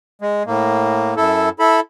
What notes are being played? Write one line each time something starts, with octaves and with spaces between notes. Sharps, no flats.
G#3
A2 A#3
F#2 E4 A4
E4 A4 B5